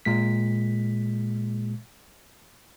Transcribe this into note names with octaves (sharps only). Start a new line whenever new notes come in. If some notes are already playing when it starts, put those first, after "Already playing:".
A#2 G#3 B6